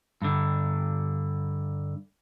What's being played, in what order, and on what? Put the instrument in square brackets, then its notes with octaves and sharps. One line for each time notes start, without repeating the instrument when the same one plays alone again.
[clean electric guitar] G2 D3